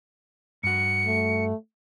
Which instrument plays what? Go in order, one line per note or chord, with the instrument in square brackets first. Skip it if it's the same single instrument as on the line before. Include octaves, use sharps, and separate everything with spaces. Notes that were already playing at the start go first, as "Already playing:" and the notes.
[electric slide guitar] G2 F#4 [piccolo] C#7
[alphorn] A3